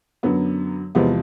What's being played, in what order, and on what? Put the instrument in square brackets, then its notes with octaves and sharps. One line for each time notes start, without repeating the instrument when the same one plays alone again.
[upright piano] F#2 D3 F#3 B3
E2 C3 F3 G#3 B3